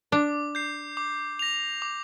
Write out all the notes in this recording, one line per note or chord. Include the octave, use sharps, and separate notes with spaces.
D4 D6
G6 C7
D6
A#6 F7
D6